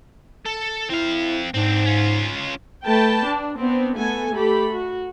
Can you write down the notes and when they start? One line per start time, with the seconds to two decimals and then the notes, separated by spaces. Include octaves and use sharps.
0.45 A4
0.89 C4 E4 F5
1.54 G#2 C4 D4
1.86 C#4 F4
2.85 A3 B4 G5 A5
3.25 D4
3.59 B3 C4 D4
3.97 A3 B3 A4 G#5
4.35 A3 G4 A4 B5
4.73 F#4